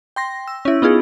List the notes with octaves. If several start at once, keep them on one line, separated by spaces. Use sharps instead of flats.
G5 C6 A#6
E6
C#4 E4
B3 D#4 F4 G#4